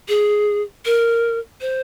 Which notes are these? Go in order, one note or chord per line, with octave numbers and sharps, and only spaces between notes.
G#4
A#4
C5